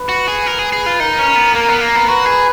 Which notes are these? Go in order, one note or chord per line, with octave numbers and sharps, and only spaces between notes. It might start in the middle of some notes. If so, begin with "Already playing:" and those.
Already playing: B4
F#4
G#4
A#4
G#4
G#4
F4
D#4 A#4
C#4
B3
A#3 A#4
B3
A#3
B3
F#4 B4
G#4